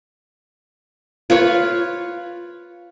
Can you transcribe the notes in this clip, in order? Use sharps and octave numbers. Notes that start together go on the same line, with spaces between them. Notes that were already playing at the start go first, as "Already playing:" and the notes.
F4 B4 C#5